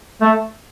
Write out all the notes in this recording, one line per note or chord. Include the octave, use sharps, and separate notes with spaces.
A3